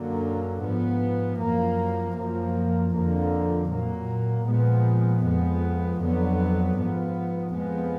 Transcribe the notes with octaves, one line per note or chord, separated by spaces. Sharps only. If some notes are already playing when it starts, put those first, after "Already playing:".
Already playing: F#2 D3 F#3 A#3
G#2 F3 B3
F#2 F3 A#3
F#2 F3 A#3
F2 D3 F3 A#3
A#2 F#3 A#3
A#2 F3 G#3 B3
F2 F3 G#3 B3
F2 D3 F#3 B3
G#2 F3 B3
F2 F3 G#3 B3